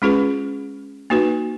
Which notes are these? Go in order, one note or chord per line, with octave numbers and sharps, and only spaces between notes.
G#3 C#4 F4 G#4 B4
A#3 D#4 F#4 B4